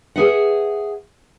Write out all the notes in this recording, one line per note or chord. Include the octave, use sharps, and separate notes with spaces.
G#4 B4 E5 F#5